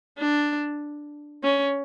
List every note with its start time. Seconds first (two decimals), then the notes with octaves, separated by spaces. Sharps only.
0.19 D4
1.44 C#4